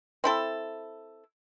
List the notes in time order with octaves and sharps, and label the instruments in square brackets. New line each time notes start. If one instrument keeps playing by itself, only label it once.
[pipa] C4 E4 A4